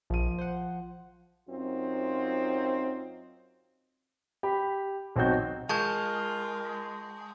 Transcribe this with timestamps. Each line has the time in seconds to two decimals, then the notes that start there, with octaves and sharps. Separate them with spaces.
0.10 A#1 F3 D#7
0.38 C5 F#5
1.49 F#2 C4 D#4 F4
4.43 G4 B5
5.16 B1 C4 D#4 F#4 G6
5.69 G#3 F4 A#4 A5 C#6 G6